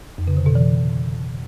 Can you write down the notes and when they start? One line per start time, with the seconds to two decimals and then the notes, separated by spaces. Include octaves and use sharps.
0.18 F2
0.27 C#3
0.37 D3
0.46 B2
0.55 E3